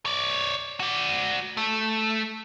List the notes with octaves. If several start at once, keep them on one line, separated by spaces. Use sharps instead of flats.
C#5 D5
F#4 D5
A3